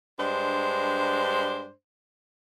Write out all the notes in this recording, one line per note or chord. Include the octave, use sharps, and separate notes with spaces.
G2 G#3 D4 C5